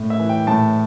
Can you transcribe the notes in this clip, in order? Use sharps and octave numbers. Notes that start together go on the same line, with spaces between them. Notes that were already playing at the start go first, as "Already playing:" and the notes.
Already playing: A2
E5
E3
G5
A2 A5